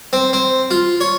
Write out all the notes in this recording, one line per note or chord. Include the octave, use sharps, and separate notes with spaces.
C4
C4
F4
C#5